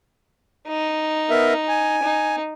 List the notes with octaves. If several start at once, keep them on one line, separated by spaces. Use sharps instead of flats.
D#4
B3 A#4 E5
G#5
D#4